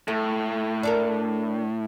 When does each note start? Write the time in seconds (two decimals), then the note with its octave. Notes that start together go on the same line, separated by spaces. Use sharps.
0.08 A2 A3
0.83 D4 A4 A#4